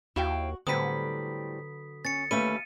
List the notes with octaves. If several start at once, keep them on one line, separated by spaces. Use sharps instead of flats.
D#2 E4 F#4 F5 G5
A2 D3 F#3 G3 C4 B4 D#6 B6
C#4 A6 C#7
D#2 A3 C#4 B4 F5 D#7